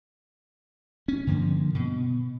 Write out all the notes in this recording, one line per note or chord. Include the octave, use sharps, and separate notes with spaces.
C#4
G2 D3 F3 A#3
B2